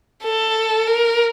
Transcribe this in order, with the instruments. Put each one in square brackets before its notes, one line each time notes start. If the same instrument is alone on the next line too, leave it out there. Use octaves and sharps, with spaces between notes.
[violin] A4
A#4